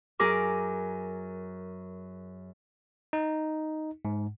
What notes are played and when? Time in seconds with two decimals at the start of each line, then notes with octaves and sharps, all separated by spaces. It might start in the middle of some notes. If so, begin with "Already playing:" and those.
0.19 F#2 G#4 A#4 D6
3.13 D#4
4.05 G#2